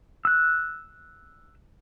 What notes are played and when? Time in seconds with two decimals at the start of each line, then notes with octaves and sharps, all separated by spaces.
0.25 E6 F#6